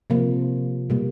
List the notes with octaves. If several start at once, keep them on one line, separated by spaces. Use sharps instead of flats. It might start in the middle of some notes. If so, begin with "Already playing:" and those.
C3 F3 A#3
B2 G3 A#3